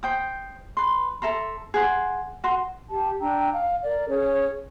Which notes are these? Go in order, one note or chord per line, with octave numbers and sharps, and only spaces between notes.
C5 G5 D#6
B4 C6
A4 E5 A#5 C6
G#4 F#5 C6
F#4 C6
G4 A5
D4 G5 A#5 E6
F5
A#4 D5
C#4 G#4 C#5